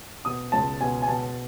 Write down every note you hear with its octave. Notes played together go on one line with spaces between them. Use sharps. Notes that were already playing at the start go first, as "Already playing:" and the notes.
B2 D#6
C#2 A5
B2 G#5
G#5
B2 A5